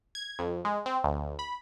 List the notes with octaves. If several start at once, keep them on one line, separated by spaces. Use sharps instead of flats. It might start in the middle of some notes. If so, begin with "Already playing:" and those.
G#6
F2
G#3
C4
D2
B5